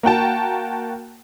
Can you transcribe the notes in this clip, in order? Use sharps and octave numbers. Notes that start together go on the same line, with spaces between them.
A#3 F#4 G5 A5